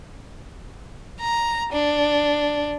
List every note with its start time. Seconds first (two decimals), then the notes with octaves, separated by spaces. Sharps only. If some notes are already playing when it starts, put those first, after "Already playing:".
1.20 A#5
1.72 D4